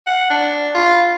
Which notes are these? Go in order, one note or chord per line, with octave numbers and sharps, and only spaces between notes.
F#5
D4
F4